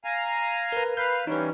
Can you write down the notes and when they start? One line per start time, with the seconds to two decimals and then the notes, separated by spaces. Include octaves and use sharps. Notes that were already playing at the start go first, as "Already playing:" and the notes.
0.04 F5 G#5 A#5
0.72 A#4 B4
0.97 B4 F5 G6
1.27 E3 G3 C#4 D#4 B4